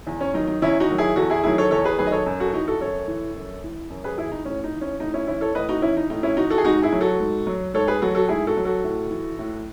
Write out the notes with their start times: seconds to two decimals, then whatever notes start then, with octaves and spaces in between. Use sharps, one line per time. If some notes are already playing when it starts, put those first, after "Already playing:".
0.07 E2
0.21 C#4
0.34 D#3 F#3 D#4
0.47 D#4
0.62 E2 C#4 E4
0.80 D#4 F#4
0.89 D#3 F#3
0.98 E4 G#4
1.16 E2 F#4 A4
1.30 E4 G#4
1.43 D#3 F#3 E4 G#4
1.58 A4 C#5
1.71 E2 A4 C#5
1.84 G#4 B4
1.98 D#3 F#3 G#4 B4
2.07 D#5
2.12 A4 C#5
2.26 F#2
2.40 F#4 A4
2.53 E3 D#4 F#4
2.67 F#4 A4
2.81 F#2 A4 C#5
3.08 E3
3.35 F#2
3.64 E3
3.90 F#2
4.04 G#4 B4
4.18 E3 E4 G#4
4.31 D#4
4.45 A2 C#4
4.64 D#4
4.73 E3
4.81 C#4
5.00 A2 D#4
5.14 C#4 E4
5.27 E3 C#4 E4
5.41 A4 C#5
5.55 A2 B4 D#5
5.69 D#4 F#4
5.82 E3 C#4 E4
5.97 D#4
6.10 A2 D#4
6.23 C#4 E4
6.37 E3 D#4 F#4
6.50 F#4 A4
6.58 G#4
6.65 G#2 D#4 F#4
6.82 E4 G#4
6.92 F#3
7.01 F#4 A4
7.20 G#2
7.47 F#3
7.74 G#2 A4 C#5
7.87 G#4 B4
8.02 F#3 F#4 A4
8.15 F#4 A4
8.28 G#2 E4 G#4
8.47 F#4 A4
8.57 F#3
8.65 F#4 A4
8.84 A2
9.11 E3
9.39 A2